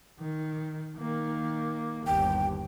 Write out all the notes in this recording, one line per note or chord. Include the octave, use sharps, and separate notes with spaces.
D#3
D#3 A#3
G1 D#2 G5